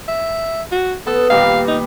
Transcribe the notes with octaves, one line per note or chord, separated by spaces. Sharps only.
E5
F#4
B3 A4
A#2 D#3 G3 F5
D#4